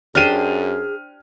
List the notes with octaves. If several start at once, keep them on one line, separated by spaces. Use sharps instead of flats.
F#2 D4 G4 G#4 C5 F6 D#7